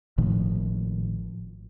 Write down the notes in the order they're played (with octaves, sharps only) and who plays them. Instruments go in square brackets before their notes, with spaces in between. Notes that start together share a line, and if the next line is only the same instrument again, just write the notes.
[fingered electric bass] G#1 A2 D#3 F3